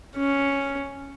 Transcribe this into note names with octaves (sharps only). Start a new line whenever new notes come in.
C#4